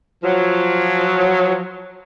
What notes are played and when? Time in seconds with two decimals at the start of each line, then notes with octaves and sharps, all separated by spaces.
0.24 F3 F#3